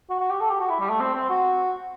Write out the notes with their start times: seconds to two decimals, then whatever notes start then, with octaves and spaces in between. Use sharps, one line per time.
0.10 F#4
0.20 F#4
0.31 G4
0.40 A4
0.50 G4
0.60 F#4
0.70 E4
0.80 G3
0.90 A3
1.00 C4
1.15 C4
1.30 F#4